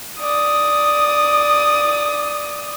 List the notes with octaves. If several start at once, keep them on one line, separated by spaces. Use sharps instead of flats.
D5 D#6